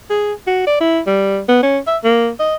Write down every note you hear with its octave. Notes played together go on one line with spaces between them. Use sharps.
G#4
F#4
D5
E4
G3
B3
C#4
E5
A#3
D#5